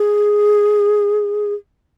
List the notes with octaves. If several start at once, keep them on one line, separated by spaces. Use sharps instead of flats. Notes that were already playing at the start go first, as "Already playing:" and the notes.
Already playing: G#4